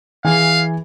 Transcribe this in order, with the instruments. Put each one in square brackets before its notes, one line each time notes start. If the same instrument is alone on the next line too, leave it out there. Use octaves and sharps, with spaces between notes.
[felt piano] E3 G#4 G#5 [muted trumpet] F5